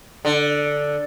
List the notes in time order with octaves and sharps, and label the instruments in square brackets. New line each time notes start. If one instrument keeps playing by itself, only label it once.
[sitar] D3